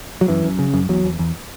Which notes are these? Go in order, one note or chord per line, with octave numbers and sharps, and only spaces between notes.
F#3
F#2 E3
F#2
C#3
F#2
E2 F#3
E2
E2